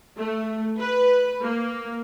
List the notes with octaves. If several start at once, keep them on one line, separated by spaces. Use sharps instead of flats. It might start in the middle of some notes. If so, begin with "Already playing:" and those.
A3
B4
A#3